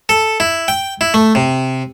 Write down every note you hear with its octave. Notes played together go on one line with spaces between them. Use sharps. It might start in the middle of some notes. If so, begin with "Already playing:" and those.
A4
E4
G5
E4
A3
C3